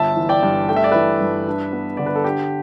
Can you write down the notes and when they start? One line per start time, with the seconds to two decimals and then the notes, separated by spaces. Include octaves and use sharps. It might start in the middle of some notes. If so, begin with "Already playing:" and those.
Already playing: G1 E5 A5
0.17 E3
0.29 D5 G5
0.43 G2
0.69 A3 G5
0.76 E5
0.84 D5
0.92 E3 B4 E5
1.21 G2
1.46 D4
1.73 B3
1.97 D3 D5
2.06 B4
2.15 A4
2.24 D4 G4